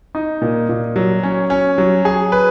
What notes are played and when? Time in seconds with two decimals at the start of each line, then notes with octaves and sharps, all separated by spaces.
0.15 D#4
0.42 A#2
0.69 A#2
0.96 F#3
1.23 C#4
1.50 C#4
1.78 F#3
2.05 G#4
2.32 B4